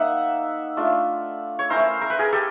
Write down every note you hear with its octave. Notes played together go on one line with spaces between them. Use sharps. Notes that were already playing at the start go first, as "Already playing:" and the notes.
Already playing: A#3 D#4 E5 F#5
A3 D4 F4
C#5
A3 C#4 E4 A#4 C5
A#4
B4
G#4 A#4
G4 A4